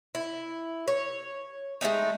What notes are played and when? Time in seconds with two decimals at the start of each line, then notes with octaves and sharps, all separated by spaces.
0.15 E4
0.88 C#5
1.81 G#3 A3 C#4 D#4